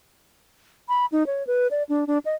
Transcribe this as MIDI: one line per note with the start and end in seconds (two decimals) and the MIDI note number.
0.89 1.06 83
1.12 1.26 63
1.27 1.46 73
1.47 1.68 71
1.71 1.83 74
1.89 2.07 62
2.07 2.18 62
2.25 2.35 75